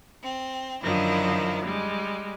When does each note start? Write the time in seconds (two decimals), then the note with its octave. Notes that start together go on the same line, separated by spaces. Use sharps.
0.22 C4
0.83 F#2 D3 D#3 F3 E4
1.65 G3 G#3